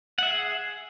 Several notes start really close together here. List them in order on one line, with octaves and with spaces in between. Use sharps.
F#5 E5 G#4